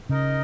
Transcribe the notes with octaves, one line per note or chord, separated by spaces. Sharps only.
C#3 D#4 A#4 D#5